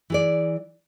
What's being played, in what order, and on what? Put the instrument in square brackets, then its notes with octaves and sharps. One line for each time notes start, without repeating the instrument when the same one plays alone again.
[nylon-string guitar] E3 G#4 D5